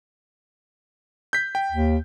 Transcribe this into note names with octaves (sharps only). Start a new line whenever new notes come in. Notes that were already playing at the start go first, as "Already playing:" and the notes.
G6 B6
G5
D#2